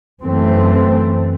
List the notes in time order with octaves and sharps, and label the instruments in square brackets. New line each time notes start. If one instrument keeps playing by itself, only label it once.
[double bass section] F#2 E3 A3 C4